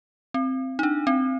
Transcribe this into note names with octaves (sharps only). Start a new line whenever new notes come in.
C4
D#4
D4
C4